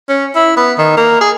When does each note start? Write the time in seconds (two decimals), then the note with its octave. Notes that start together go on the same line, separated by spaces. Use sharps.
0.09 C#4
0.35 E4
0.57 B3
0.78 D#3
0.97 A#3
1.21 G#4